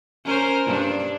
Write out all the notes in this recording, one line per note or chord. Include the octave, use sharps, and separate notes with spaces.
C#4 A#4 C5
G2 D4